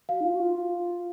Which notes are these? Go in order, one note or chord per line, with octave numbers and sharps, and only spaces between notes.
F#4 F5
D#4
F4
F#4
F4